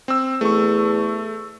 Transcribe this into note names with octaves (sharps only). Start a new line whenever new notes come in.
C4 E6
E2 A3 C#6